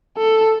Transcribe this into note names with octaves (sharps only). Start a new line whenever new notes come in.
A4